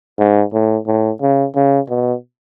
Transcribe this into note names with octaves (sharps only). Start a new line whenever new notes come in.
G#2
A2
A2
C#3
C#3
B2